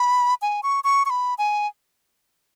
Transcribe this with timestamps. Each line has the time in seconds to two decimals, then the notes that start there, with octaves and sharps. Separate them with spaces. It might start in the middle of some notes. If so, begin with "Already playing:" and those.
Already playing: B5
0.42 G#5
0.63 C#6
0.84 C#6
1.06 C#6
1.10 B5
1.38 G#5